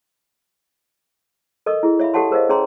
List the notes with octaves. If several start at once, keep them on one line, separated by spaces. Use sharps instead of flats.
A4 A#4 D#5 C#6 D#6
E4 G#4
C#5 E5 F5 B5
G4 A4 C#5 F#5 A5 C6
G#4 A#4 C5 C#5 D#5 F5
C#4 G#4 C#5 A#5 C6